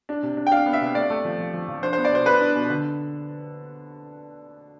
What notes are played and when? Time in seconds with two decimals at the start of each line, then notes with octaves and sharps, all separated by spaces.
0.09 D4
0.23 C3
0.37 D4
0.47 G5
0.51 D4 F5
0.66 B3
0.73 E5
0.81 C3
0.95 A3 D5
1.10 A3
1.25 F3
1.39 F3
1.54 F3
1.68 F3
1.83 D4 C5
1.93 C5
1.98 B3
2.05 D5
2.12 B2 C5
2.26 B3 B4
2.41 D4
2.55 B2
2.70 D3